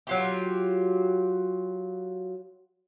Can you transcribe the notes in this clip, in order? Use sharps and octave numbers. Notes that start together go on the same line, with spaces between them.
F#3 F4 G4